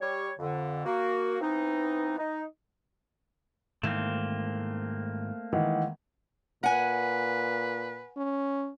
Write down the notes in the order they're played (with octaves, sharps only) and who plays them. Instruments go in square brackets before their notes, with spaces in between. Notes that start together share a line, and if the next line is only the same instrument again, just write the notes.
[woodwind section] G3 C#5
F2 D3
A#3 F#4
E3 B3 C4 D#4
D#4
[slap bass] G#2 D#3 E3 [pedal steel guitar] A3 A#3 C4
[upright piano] D#3 E3 G#3 [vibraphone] F#5
[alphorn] A#2 [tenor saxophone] B4 [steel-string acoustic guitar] F#5 G#5
[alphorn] C#4